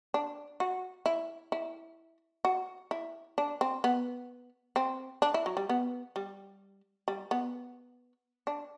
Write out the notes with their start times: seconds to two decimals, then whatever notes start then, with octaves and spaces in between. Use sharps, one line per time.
0.14 D4
0.60 F#4
1.06 E4
1.52 E4
2.45 F#4
2.91 E4
3.38 D4
3.61 C4
3.84 B3
4.76 C4
5.22 D4
5.34 E4
5.46 F#3
5.57 G3
5.69 B3
6.16 G3
7.08 G3
7.31 B3
8.47 D4